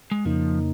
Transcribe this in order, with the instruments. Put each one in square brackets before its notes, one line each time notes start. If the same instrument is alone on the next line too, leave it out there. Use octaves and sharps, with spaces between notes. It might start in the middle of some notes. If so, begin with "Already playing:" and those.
[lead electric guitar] G#3
[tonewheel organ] F2 C#3 A#3 D#4 [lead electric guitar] F3